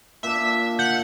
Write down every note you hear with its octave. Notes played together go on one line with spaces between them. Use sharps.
A#2 D4 E5
F#5 G6